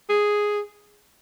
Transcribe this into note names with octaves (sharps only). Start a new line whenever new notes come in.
G#4